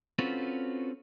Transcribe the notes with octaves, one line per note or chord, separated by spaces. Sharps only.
C4 C#4 F4 F#4 A4 B4